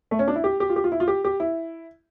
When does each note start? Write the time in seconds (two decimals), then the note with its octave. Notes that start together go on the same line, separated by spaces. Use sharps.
0.11 A3
0.19 C#4
0.28 D4
0.36 E4
0.44 G4
0.60 G4
0.69 F4
0.76 G4
0.84 F4
0.92 E4
1.00 F4
1.08 G4
1.25 G4
1.40 E4